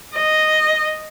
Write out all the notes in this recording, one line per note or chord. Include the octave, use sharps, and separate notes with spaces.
D#5